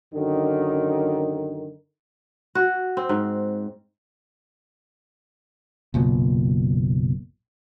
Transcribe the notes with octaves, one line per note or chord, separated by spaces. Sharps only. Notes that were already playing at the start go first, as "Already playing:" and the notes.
F#2 D3 D#3
F#4
C4
G#2
F#1 B1 A#2